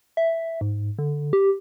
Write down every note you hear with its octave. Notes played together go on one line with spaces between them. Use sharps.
E5
G#2
D3
G4